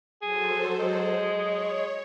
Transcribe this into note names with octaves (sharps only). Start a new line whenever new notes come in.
F#3 G#4 A4 C5
G#3
C#5